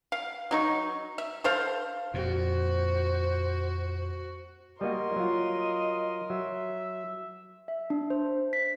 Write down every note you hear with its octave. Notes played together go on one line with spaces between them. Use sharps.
F5
F#3 D#4 C#6
E5
A4 C5 F5
F2 A#2 F#4 C5
G3 A#3 F#4 A#4 D#5 C6
F#3 F4
F#3 E5
E5
D4
C5
B6